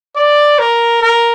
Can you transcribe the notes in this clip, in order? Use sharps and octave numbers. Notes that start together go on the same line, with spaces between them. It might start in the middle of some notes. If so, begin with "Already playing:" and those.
D5
A#4
A#4